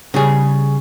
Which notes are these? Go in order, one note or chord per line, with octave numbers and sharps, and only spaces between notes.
C#3 G3 G#4